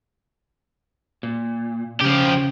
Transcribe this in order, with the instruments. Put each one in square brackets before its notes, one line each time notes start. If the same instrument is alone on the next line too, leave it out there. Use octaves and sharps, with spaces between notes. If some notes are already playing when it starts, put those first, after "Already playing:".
[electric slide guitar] A#2
[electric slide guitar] C#3 [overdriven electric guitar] F3 G4